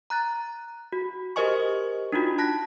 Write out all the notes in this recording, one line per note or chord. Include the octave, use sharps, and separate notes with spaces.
A#5 F#6 A6
F#4
G4 A#4 C5 D#5 G#5 C#6
D4 D#4 F4 F#4
A5 F#6 A#6 B6